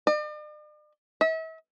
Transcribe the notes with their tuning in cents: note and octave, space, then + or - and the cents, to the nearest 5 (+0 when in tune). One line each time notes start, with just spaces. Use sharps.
D5 +45
E5 -40